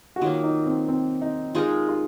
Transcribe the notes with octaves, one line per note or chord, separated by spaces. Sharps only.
F#4
D#3 F#3 A#3 F4
D#4
C4
C4
D#4
G#3 D#4 F4 A#4
F4